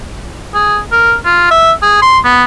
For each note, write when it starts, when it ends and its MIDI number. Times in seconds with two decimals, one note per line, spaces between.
0.54 0.78 68
0.92 1.14 70
1.25 1.47 65
1.51 1.72 76
1.82 2.00 68
2.02 2.19 84
2.25 2.44 59